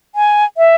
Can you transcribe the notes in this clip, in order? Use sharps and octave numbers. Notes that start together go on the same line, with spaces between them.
G#5
E5